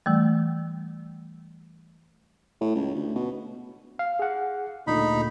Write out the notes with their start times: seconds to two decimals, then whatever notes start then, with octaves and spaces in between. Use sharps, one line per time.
0.06 E3 G3 A3
2.61 A2
2.75 C#2
2.95 D2
3.15 B2
3.99 F5
4.19 G#4 F#5
4.87 D2 A#2 D3 D#4 B5